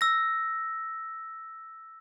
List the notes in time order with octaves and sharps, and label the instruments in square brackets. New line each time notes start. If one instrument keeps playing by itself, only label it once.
[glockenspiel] E6 A#6